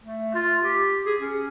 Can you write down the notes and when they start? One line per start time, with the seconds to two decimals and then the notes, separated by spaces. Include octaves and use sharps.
0.02 A3
0.35 F4
0.62 G4
1.06 G#4
1.21 C#4